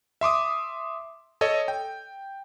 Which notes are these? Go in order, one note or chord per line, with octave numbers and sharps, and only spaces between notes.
E5 C6 D6 D#6
A4 C#5 D#5
G5